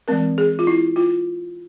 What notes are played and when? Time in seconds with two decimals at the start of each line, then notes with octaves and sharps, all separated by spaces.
0.08 E3 G#3 C4 A#4
0.38 G#4
0.59 F4
0.67 E4
0.96 F4